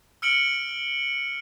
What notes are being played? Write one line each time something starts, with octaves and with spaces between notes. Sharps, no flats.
E6 F6 C#7 D7 F#7